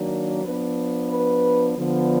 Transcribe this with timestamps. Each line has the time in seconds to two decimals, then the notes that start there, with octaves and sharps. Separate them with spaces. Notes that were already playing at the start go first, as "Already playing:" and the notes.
Already playing: D#3 F#3 A#3 D4
0.44 F3 B3 D4 B4
1.10 B4
1.77 D3 F3 B3